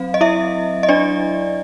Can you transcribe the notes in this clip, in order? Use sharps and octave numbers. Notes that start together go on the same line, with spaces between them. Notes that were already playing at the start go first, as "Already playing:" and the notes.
Already playing: F#3 C4 F5
D#5
E4 E5
D#5
D4 D5